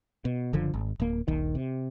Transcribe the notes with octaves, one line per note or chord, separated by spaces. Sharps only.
B2
F#1 D3 F3
G#1
D1 A#3
D#1 A#1 D#3
C3